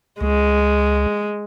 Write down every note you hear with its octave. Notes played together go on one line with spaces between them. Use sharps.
C#2 G#3